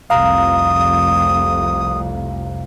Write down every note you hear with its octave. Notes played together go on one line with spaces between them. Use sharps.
F1 C2 F2 F5 A#5 D#6